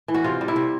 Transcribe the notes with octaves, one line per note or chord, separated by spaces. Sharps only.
E3
F#4
C3 F4
G3
E4
C3